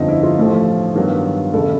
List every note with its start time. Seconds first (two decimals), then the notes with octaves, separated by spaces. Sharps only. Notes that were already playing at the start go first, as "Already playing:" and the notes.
Already playing: G1 F2 D3 F3 D#4
0.09 E4
0.23 F4
0.38 A1 A2 F3 A3
0.95 G2 D#3 F#3 B3
1.53 E1 C#3 A4